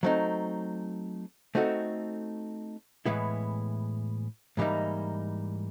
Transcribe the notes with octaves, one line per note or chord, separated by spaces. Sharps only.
F#3 A3 C4 D#4
A3 C4 D#4 F#4 A4
A2 E3 G#3 B3 E4
G#2 E3 G3 A#3 D#4